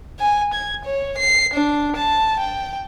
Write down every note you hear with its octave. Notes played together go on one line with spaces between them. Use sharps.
G#5
G#6
C#5
C7
D4
A5
G5